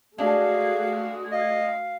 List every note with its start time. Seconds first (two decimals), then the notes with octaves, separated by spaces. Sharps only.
0.18 G#3 A3 D4 F#4 G#4 F5
1.32 D#5 F5